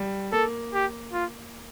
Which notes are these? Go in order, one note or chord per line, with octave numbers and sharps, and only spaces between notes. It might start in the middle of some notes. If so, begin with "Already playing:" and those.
Already playing: G3
A#3 A4
G4
F4